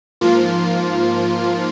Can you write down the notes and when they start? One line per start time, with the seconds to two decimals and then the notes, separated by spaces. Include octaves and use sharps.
0.21 G#2 F3 A#3 F4